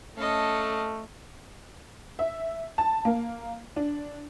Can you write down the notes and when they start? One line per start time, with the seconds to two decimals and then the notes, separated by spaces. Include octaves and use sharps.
0.17 A3 C#4 A4 D#5 F5
2.19 E5
2.78 A5
3.05 A#3
3.76 D4